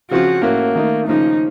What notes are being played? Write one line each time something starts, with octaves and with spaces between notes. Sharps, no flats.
C#3 F3 C4 F4 F#4
A2 A3 A#3 C#4 F#4
D#3 A3 D#4
C#3 F3 A#3 D#4